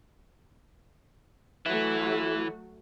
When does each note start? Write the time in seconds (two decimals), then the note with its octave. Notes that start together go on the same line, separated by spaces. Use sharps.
1.66 E3 F#3 A3 E4 F#4